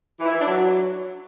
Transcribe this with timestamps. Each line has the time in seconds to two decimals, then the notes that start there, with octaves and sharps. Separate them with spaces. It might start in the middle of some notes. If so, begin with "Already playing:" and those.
0.19 E3
0.26 E4
0.32 E3
0.39 D4
0.46 F#3